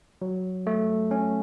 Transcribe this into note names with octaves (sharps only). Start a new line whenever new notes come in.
F#3
A3
C#4